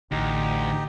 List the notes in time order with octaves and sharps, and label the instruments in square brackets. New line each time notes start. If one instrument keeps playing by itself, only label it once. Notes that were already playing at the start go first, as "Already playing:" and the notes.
[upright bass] A1 [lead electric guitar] D2 [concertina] D#4 G4